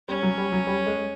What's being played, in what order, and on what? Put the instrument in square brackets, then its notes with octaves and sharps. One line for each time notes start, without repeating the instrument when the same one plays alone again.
[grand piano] G3 [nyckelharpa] C#4
[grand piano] F#3
G3
F#3
G3
G#3